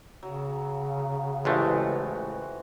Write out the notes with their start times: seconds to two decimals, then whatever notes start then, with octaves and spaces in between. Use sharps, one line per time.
0.23 C#3 F#3
1.45 A1 E3 F3 G#3 A3 F#4